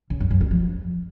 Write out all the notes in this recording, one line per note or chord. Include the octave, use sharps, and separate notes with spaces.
C#3
F#2
F#2
G3
F3